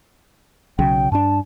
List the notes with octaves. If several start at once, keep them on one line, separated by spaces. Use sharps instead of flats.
B1 C#3 F#3 G5
G2 D4 A5